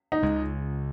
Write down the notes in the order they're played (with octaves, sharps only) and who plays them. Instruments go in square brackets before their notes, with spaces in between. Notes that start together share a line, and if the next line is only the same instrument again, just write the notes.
[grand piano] D#4
[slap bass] C#2 C#3 G#3